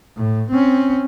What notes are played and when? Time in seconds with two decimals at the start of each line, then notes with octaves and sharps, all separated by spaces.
0.17 A2
0.51 C4 C#4